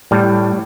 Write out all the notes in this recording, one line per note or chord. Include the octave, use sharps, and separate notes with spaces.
A2 G3